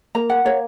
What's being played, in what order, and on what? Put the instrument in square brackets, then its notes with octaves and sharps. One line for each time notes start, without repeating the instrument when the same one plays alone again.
[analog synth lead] A#3 [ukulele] A#5
[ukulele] F#5
[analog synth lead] A#3 [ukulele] C#5